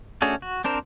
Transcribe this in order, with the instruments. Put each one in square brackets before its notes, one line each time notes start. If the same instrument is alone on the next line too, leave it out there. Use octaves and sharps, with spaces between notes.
[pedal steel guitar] A3 C#4 D4 F#4 G#4
F#4
C4 D4 A#4 C5